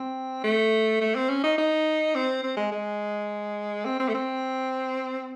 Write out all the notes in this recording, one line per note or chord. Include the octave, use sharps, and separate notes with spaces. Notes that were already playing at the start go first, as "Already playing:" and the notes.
Already playing: C4
A3
A3
C4
C#4
D#4
D#4
C4
C4
G#3
G#3
C4
C4
A3
C4